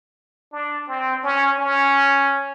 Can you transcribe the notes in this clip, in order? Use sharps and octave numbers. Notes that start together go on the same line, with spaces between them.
D4
C4
C#4
C#4